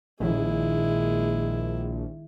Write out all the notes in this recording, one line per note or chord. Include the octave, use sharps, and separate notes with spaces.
A#1 D#3 G#3 B3 E4